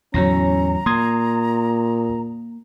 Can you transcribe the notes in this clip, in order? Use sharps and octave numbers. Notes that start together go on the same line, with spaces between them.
E2 A2 D3 F#3 C#4 A#5 A#6
A#2 A#3 C6 D#6 G#6